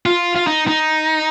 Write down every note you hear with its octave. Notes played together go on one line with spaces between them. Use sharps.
F4
F4
D#4
D#4